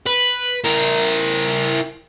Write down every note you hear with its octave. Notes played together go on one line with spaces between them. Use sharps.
B4
E4 A#4